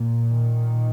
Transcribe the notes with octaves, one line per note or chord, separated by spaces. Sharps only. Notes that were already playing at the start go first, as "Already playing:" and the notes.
Already playing: A#2
D#3